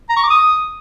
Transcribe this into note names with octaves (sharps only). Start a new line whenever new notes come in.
A#5
C#6
D6
D#6